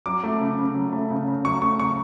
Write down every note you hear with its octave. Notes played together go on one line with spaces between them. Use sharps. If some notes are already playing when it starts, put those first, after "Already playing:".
F#3 D6
A3
C#3
C#3
F#3
A3
C#3
C#3
F#3 C#6
A3 C#6
C#3 C#6